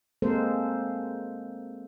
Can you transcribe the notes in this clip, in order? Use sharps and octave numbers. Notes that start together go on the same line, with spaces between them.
G#3 A#3 C4 A4 A#4 C5